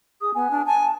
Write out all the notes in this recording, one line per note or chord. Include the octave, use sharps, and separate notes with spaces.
G#4 D#6
B3 G#5
D4
G#5 A5
A5